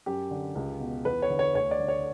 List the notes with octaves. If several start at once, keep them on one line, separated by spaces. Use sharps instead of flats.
F#2 G4
D3
C#2
B2
E2 B4
C#5
D3
C#5
D2 C#5
D5
D3
C#5